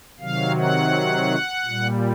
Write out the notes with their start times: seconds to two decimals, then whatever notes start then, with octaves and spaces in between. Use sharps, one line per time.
0.20 C3 D#3 F#3 F5
0.57 F#5
1.65 A#2 G3